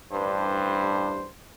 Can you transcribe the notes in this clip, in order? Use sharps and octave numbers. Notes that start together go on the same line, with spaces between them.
A1 G2 G3 D4 B4 C5